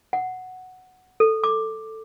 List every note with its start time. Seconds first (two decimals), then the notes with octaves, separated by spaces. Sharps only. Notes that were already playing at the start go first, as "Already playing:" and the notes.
0.13 F#5
1.20 A4
1.44 D6